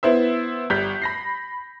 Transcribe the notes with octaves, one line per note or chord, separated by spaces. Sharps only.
B3 E4 C5 E5
G1 G3 G6 B6
B5 A#6 C7